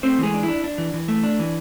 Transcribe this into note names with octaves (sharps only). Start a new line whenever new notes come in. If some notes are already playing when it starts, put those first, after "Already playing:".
A3 C4 C5
E3 G#3 G#4
D4
E4
D4
D4
E3
E3
A3
D4
E3